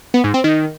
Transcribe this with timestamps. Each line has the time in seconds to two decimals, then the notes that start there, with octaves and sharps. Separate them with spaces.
0.14 B3
0.24 G#2
0.34 C4
0.44 D#3